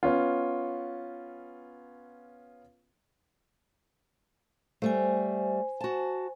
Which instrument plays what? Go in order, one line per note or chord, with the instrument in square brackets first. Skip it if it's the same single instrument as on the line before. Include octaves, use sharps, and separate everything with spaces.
[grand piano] B3 C#4 F4
[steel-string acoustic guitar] G3 A3 [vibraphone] C5 G#5
[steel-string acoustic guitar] F#4 A5